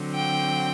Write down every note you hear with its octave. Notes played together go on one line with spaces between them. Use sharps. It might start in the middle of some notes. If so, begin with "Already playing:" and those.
Already playing: D3 F#3 C4
G5